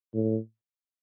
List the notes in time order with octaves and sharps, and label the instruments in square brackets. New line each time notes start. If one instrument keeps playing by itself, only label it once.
[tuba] A2